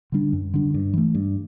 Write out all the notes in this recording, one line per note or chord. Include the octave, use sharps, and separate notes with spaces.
D3 G3 D4
F#2
D3 G3 D4
G2
E3 A3
G2